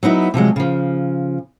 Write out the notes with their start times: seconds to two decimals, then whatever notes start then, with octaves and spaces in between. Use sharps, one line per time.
0.03 F#3 B3 D#4 E4
0.34 C3 F3 F#3 G#3
0.56 C#3 F3